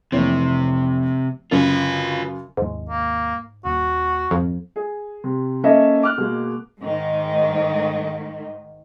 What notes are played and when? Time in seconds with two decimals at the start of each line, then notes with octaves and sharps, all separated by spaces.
0.12 F1 C3 E3 C#5
1.51 F#2 C#3 F4 B4
2.57 G#1 D#2 G#2 G#3
2.89 A#3
3.65 D#1 F#4
4.31 D#1 G#1 F2
4.76 G#4
5.24 C3
5.64 A#3 C#4 D#4 A4 D#5 E5
6.03 D6 F6 F#6
6.18 B2 G#3 A#3
6.82 G#2 D#3